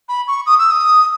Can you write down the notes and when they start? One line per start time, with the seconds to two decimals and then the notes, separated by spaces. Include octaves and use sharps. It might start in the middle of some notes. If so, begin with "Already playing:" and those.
0.09 B5
0.28 C#6
0.46 D#6
0.59 E6
0.71 D#6